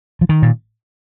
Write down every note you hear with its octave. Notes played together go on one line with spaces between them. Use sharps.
F3
D#3
A#2